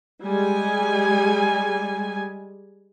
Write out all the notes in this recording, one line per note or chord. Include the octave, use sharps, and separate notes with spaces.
G3 G#3 G#5